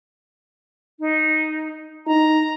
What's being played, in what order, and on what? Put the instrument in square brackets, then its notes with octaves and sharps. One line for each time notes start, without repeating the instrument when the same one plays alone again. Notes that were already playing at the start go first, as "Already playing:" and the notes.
[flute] D#4
[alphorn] D#4 [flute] A#5